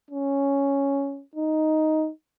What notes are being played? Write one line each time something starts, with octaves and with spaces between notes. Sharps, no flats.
C#4
D#4